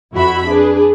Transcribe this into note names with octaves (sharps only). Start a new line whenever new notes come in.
F2 E4 F#4 E5 B5
D4 G#4 B4